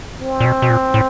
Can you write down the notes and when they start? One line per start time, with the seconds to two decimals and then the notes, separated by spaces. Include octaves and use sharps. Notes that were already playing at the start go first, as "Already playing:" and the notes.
0.20 C4
0.40 A#2
0.45 B2
0.62 B2
0.70 A#2
0.94 A2